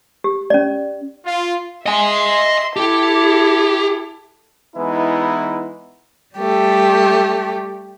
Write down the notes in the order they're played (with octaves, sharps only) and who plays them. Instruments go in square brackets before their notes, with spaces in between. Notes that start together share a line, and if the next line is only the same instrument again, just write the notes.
[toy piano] G4
C#4 D5
[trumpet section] F4
[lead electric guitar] D#5 G#5 [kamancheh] E5 C6
[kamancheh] E4 A4 [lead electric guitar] G4
[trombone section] E3 G#3 B3 D#4 E4
[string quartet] G3 A3 G4